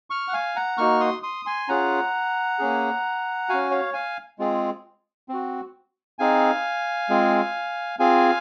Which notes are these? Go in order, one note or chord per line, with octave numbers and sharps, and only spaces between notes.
C#6 F6
F#5
F5 G#5
F#5 A#5
A#3 D#4 F#4 C#6 F6
C6 D#6
C6 D#6
G#5 C6
C#4 F4 G#4 F#5 A#5
A#3 C#4 G#4
C#4 F#4 F5 G#5
C#5 F5
F5 G#5
G#3 C4 F4 G#4
C4 F#4
C4 D#4 G#4 F5 G#5
G#3 C4 F4 G#4
C4 F4 G#4 F5 G#5